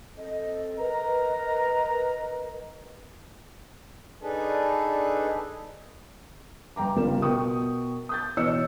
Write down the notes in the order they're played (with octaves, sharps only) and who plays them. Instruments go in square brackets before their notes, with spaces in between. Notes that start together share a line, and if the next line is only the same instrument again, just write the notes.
[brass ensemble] C4 A4 [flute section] D#5
[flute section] A#4 B4 D#5 [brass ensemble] A#5
[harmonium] D4 D#4 G#4 A4 B4
[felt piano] G2 G5 A#5 D6
G1 C#3 G3 F4 A#4 E7
B2 A#4 G5 C#6 D#6
D#6 G6 A6
B2 E3 C#5 D#5 E6 C#7